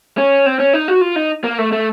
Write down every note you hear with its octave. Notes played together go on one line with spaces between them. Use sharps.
C#4
C4
C#4
D#4
F#4
F4
D#4
A#3
A3
A3